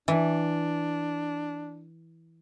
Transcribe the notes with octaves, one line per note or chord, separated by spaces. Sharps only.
E3 D4